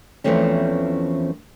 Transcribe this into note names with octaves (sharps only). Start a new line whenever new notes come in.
E2 E3 F3 A3 C4 C#4